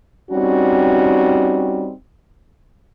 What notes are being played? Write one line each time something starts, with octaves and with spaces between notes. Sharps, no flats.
G3 C4 C#4 D#4 F#4